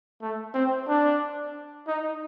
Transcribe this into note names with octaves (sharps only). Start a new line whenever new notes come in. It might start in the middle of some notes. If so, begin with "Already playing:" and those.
A3
C4
D4
D#4